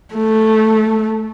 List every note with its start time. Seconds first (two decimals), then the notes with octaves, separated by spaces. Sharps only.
0.14 A3